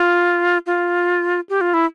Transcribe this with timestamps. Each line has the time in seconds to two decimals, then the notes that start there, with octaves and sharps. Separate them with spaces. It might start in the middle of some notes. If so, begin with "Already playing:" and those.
Already playing: F4
0.66 F4
1.49 G4
1.61 F4
1.74 E4